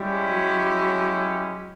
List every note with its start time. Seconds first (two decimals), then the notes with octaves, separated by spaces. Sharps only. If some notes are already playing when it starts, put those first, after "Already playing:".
Already playing: G3 G#3 C#4 E4 G4
0.31 F#3